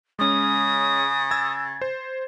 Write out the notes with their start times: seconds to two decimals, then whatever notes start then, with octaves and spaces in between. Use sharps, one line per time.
0.19 C#3 G#3 C#4 D#6
1.31 E6 G#6 A6
1.81 C5